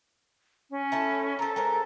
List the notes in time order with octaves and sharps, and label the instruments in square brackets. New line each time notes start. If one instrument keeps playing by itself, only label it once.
[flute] C#4
[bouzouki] A3 E4 A5
[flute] A4 [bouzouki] A#4 C5
[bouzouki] G#3 A#4 C5